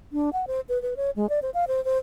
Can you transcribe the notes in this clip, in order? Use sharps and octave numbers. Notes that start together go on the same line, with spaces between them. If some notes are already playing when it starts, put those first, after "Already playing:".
D4
F#5
C5
B4
B4
C#5
G#3
D5
C5
F5
C5
C5